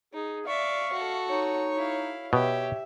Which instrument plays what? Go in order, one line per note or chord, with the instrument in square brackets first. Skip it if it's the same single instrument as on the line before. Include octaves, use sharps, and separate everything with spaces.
[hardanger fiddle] D#4 [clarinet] G#4
[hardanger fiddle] D5 E5 [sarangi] F5 [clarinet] C#6
[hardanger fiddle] F#4 A4
[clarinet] D#4 [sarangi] C#5
[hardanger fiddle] E4 F5
[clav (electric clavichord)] B2 [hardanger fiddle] G4 [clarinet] C#5 [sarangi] E5